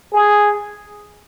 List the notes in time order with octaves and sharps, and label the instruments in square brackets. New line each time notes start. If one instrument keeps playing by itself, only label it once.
[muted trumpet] G#4